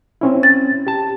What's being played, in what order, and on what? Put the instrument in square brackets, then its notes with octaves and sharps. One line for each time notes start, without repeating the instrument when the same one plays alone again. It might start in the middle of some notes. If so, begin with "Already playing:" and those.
[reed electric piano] C4 C#4 E4
[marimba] A6
[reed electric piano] G4 A5